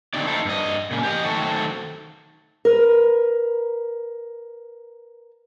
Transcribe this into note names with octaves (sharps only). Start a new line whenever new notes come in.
D3 F#3 C4 D#4 D5
C4 D#4 E4 A4
G2 D#5
A#2 C#3
G4 C5 D#5
D#3 F#3 A3 C4 F#4 A4
A#4 B4